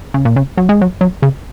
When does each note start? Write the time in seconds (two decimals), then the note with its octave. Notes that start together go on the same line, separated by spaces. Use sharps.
0.14 C#3
0.25 A#2
0.36 C#3
0.57 F#3
0.69 G#3
0.81 F#3
1.01 F#3
1.22 C#3